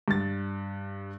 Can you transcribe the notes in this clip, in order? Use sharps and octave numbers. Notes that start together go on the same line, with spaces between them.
G2 A6